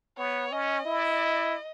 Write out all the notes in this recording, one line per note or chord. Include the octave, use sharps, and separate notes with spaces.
B3 C#5
C#4 D#5
E4